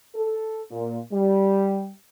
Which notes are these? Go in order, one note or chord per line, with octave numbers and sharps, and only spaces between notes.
A4
A#2
G3